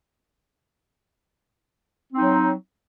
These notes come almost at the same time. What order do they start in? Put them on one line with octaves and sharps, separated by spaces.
C4 D#4 F#3